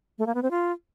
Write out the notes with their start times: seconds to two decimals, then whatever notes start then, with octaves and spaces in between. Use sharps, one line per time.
0.19 A3
0.27 A#3
0.35 B3
0.43 C4
0.51 F4